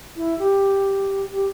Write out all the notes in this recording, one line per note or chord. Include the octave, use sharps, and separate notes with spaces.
E4
G4
G4